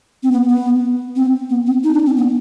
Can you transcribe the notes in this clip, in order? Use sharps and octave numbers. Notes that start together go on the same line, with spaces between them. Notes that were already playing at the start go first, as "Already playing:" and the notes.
C4
B3
B3
C4
B3
C4
D#4
D4
C4
B3